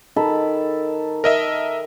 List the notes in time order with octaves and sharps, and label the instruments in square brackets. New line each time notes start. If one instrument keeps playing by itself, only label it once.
[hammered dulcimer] D#3 A4 B5
[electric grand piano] A#4 D#5 E5